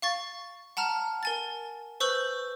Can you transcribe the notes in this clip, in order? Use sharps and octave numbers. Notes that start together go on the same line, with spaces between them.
F5 C#6 A6
F#5 A5 A#5 F6
A#4 G#5 A6
B4 C5 C#6 E6 G6 F#7